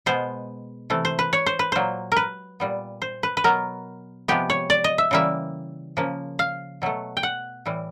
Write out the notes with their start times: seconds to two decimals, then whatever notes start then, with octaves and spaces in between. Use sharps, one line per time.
0.06 B2 G#3 B3 C5
0.90 C3 E3 A3
1.05 C5
1.19 B4
1.33 C#5
1.46 C5
1.59 B4
1.72 A#2 F#3 A#3 C5
2.12 A#4 B4
2.60 A#2 G3 B3
3.02 C5
3.23 B4
3.37 B4
3.44 B2 F#3 B3 A#4
4.28 C3 F3 G#3 B3 G4
4.50 C#5
4.70 D5
4.84 D#5
4.98 E5
5.11 C#3 E3 G3 A#3 E5
5.97 C#3 F3 A#3
6.39 F5
6.82 B2 F#3 A3
7.17 G5
7.23 F#5
7.66 A2 E3 G3